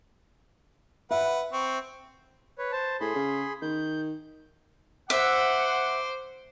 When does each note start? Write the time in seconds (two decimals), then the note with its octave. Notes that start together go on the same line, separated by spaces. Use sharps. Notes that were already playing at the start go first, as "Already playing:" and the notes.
1.11 B4 E5 F#5
1.53 C4 C#6
2.58 B4 C#5
2.72 C5 A5
3.01 A2 G#4 B5 C6
3.15 C#3
3.62 D#3 G6
5.10 C5 E5 F#5 D6